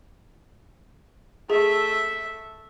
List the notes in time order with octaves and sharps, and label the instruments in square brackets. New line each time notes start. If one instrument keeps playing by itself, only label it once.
[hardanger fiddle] A3 E5 [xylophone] G#4